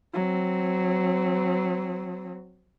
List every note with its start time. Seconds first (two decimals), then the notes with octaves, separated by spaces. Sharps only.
0.14 F#3 C4